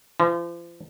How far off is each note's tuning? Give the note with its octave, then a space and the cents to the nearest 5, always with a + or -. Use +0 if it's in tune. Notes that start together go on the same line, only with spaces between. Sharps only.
F3 -40